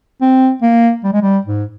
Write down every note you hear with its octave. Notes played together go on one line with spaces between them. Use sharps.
C4
A#3
G3
G#3
G3
G#2